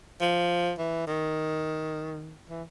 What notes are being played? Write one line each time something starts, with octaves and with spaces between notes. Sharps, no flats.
F3
E3
D#3
E3